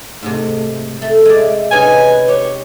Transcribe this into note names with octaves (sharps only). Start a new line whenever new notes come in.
G#2 C3 A3
A3 E5
G#3 D5
C3 C#4 D#4 B4 G#5
G4 C#5